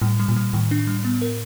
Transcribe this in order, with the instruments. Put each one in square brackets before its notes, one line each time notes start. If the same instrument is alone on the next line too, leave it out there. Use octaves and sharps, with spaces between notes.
[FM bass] A2 [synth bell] G3
[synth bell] G3
[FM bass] A#2
[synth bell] G3
[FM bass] A2 [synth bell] D#3
[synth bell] D4
G3
B3
A#4